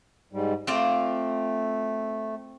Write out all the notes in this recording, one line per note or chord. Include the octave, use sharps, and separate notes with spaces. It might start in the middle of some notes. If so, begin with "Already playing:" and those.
G#2 G3
A3 C4 F4 D5